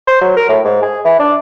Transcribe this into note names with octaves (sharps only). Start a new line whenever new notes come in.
C5
F#3
A#4
A2
G#2
G#4
E3
D4